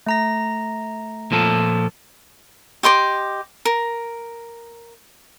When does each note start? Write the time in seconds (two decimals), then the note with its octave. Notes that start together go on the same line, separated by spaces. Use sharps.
0.06 A3 A#5 A#6
1.32 A#2 F3 A4
2.83 G4 D#5 C6 D6
3.65 A#4